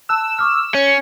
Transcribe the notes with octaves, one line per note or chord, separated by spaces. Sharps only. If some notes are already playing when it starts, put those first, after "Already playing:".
A5 E6 F#6
C#6 D6 F6
C#4 C#5 C#7